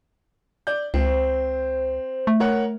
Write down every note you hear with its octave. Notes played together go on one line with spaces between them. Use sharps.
D5 G6
C#2 C4 C5
A3
A#4 C#5 F#5